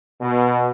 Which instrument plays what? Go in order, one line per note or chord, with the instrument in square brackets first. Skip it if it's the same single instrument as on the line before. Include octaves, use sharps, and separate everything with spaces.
[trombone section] B2